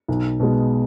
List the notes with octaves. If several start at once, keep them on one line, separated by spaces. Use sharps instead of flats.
B1
B2 G#3